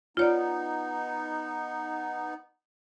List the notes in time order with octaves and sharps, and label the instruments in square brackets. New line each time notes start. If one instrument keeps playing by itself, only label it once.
[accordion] B3 D#4 [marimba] F4 C#5 D5